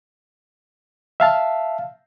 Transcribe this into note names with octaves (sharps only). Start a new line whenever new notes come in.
E5 F5 A5